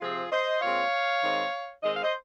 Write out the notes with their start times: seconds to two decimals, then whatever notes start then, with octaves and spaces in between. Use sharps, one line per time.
0.01 C3 F3 C4 F4 G#4
0.31 C5 D#5
0.61 A#2 G#3 C4 C#5 F5
1.22 D#3 G#3 C4
1.83 D#3 G#3 C4 D#5
1.93 F5
2.03 C5 D#5